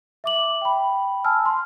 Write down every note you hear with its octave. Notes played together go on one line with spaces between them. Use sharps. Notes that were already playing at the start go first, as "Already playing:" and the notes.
E5 D6 F#7
G5 B5
G#5 A5 E6 F6
C6